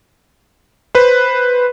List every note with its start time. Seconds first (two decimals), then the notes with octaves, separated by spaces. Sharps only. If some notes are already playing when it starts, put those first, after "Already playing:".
0.95 B4 C5